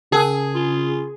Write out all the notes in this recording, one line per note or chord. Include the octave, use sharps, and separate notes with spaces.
C#3 C#4 G#4 A#4 A5
F4